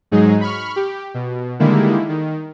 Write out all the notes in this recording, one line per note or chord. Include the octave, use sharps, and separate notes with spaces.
G#2 F#3 G#3 D#4 G#4
B5 C#6 F6
G4
B2
D3 D#3 G3 G#3 A#3 E4
D#3